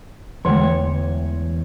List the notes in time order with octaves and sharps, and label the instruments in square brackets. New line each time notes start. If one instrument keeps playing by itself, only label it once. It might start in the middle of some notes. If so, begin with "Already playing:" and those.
[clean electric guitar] E2 E3 C#5 [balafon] D3 G#3 A3